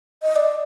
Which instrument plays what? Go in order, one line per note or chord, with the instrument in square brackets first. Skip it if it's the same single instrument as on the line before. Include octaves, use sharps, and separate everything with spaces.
[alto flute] D#5
D5